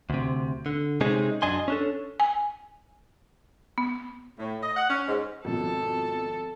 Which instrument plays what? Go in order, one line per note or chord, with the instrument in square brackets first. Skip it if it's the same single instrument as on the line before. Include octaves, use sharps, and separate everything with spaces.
[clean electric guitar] D2 C3
D3
C3 G#3 C4 C#4 D#4 G#4
F#2 D4 D#5 G#5 C6
C#4 D4 A4
[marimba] G#5
B3
[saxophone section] A2
D#5
F#5
C#4
G#2
[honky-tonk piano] G#1 B2 F3 [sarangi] A4